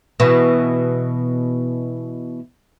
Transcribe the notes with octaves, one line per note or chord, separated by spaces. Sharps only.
B2 E3